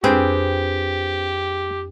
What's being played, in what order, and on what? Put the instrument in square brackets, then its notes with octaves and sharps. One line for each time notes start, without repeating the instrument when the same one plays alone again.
[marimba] F2 D4 [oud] C4 [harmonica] G4 [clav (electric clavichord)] G#4 B4 C5